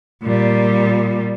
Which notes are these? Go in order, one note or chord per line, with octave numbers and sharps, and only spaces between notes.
A#2 G3